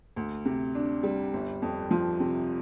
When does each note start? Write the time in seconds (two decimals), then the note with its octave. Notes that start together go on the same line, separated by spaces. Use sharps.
0.16 D2
0.45 C3
0.75 D4
1.03 G3
1.34 G1
1.62 F2
1.91 F3
2.20 C3